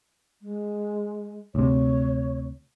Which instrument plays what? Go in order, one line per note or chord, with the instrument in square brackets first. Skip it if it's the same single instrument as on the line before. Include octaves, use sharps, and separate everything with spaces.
[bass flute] G#3
[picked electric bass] D2 C3 [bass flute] C#5